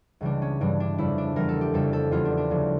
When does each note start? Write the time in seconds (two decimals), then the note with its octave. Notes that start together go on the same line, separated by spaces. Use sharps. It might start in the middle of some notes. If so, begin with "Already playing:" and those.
0.21 C#2 C#3 E3 G3 D4
0.42 C#4
0.61 G2 E3 G3 D4
0.80 D4
0.98 F2 C#3 G3 E4
1.18 D4
1.36 E2 E3 G3 A#4
1.49 A4
1.61 G4
1.74 F2 C#3 G3 A4
1.93 A4
2.11 E2 E3 G3 F4
2.25 D4
2.37 D4
2.50 D2 C#3 F3